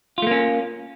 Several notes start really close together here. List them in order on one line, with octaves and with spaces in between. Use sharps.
F4 A3 A#3 C#4